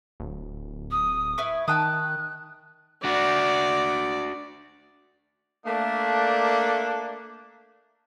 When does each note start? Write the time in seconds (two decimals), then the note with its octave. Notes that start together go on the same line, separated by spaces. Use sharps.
0.20 D1
0.91 D#6
1.38 E4 B4 C#6
1.68 D#3 G5 A5 D#6 F#6
3.04 D4 F#4 D5
5.66 A3 A#3 D4